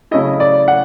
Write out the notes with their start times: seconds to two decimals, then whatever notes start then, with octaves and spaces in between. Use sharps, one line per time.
0.11 C#3 F#3 A3 C#4 E4 D#5
0.40 D5
0.68 F#5